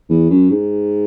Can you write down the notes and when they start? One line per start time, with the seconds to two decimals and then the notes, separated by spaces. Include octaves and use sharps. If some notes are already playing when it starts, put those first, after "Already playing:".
0.09 E2
0.29 F#2
0.50 G#2